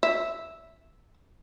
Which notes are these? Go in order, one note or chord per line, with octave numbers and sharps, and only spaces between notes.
E5